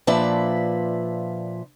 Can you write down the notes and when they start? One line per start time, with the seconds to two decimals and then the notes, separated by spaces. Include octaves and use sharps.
0.07 A#2 F3 D4 B4 E5